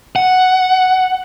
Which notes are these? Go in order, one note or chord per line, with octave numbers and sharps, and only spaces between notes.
F#5